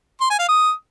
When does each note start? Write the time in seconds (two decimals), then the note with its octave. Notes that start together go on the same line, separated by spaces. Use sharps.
0.21 C6
0.30 G#5
0.39 F5
0.49 D#6